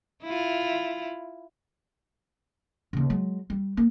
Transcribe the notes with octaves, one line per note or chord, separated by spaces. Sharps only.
E4 F4
D#2 C#3
F#3 G#3
G3
A#3